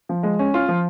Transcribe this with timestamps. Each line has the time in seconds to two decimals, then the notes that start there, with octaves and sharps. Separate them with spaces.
0.09 F3
0.23 G#3
0.39 C#4
0.54 F4
0.69 F3